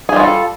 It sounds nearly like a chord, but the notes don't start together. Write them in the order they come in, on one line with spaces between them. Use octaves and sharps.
G#4 G3 F4 F#4 A4